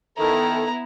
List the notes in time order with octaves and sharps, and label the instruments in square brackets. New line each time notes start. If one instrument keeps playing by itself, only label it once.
[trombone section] D#3 [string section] B3 E4 [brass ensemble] A4 [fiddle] A#5